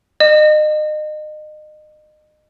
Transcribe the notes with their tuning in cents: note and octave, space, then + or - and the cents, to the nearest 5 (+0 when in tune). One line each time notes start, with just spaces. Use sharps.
D#5 -30